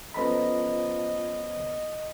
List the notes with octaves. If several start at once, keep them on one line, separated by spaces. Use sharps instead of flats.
F3 B3 C#4 A4 C5 D#5 A#5 B5